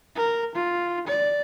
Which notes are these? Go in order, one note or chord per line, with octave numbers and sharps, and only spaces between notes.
A#4
F4
D5